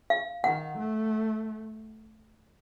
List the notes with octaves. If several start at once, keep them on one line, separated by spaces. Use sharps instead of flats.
F5
D#3 F#5
A3